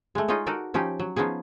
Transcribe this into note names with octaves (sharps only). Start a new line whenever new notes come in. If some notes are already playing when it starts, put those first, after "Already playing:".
G#3 A3
D#4 F4 G#4 C#5 D#5
D#4 F#4 A4 A#4 D5
F3 C#4 D#4 G4
F#3
F3 B3 C#4 D#4 G#4